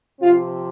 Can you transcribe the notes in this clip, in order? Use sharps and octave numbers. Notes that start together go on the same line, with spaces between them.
C3 F3 C4 F4